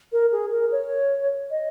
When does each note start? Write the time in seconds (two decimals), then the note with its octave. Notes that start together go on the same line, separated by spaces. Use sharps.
0.12 A#4
0.32 G#4
0.51 A#4
0.72 C#5
1.51 D#5